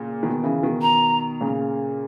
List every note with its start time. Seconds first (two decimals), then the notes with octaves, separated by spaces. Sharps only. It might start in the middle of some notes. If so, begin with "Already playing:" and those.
Already playing: A#2 C#3
0.23 B2 D#3
0.44 C#3 E3
0.63 B2 D#3
0.82 A#5
1.41 A#2 C#3